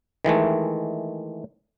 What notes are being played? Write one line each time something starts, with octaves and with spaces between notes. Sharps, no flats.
D#3 E3 G#3 A3